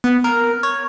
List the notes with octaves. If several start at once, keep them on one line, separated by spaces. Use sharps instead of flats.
B3
A#4
C#5